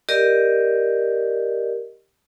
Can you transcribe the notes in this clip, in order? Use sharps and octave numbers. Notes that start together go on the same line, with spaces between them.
G4 A#4 D5 D#5